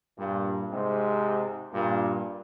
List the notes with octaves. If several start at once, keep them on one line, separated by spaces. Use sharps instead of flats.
G2 A#2
G#2 C3
G2 A#2